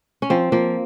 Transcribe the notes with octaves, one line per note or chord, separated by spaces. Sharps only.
C#4
F3 C4
F3 A#3